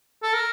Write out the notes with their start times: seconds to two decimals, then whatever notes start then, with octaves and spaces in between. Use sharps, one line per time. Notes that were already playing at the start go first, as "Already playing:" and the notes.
0.23 A4
0.34 A#4